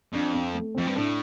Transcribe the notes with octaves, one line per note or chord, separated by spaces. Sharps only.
F2 D4
C4
A3
F2 C4
G2
A2 D4